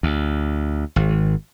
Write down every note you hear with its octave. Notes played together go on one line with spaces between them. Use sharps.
D2
G#1